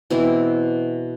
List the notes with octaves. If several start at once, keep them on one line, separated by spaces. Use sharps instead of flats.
B2 E3 C4 E4